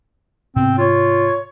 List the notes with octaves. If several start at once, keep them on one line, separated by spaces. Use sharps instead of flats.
G#2 C3 B3 C4
F4 C#5